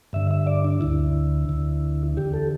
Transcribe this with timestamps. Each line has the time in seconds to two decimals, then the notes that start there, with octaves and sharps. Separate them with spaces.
0.13 G2 D3 E5
0.31 E5
0.47 D5
0.65 D4
0.81 D2 D3 E4
1.49 D2 D3
2.17 E2 D3 G4
2.34 A4